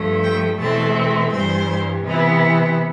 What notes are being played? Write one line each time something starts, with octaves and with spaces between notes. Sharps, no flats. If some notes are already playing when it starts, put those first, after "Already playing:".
Already playing: G2 F3 A3
G5
E2 B2 A3 C4 E4 A5
G2 E3 G3 C5
C3 E3 B3 E4